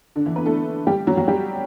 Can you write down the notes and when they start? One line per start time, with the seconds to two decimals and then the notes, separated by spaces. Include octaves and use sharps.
0.16 D3 D4
0.26 E3 E4
0.36 B3 B4
0.46 A3 A4
0.87 G3 G4
1.07 F#3 F#4
1.17 F#3 F#4
1.28 G3 G4